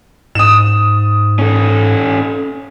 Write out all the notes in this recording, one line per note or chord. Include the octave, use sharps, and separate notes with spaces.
G#2 D#6 E7
C#4 A4